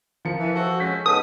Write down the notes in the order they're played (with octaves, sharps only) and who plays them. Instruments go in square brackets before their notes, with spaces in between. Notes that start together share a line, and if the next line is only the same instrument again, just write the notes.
[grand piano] F3 A#4 C#7
[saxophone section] E3
F#4 A4 C5
[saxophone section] G#3 C#4 [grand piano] G6 B6
[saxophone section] G#3 B3 D#4 [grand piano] A4 [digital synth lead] D#6